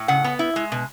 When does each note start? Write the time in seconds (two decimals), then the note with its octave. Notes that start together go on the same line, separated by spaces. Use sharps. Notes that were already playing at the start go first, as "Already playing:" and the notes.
Already playing: A2
0.08 C#3 F#5
0.24 B3
0.39 E4
0.56 G#3
0.72 B2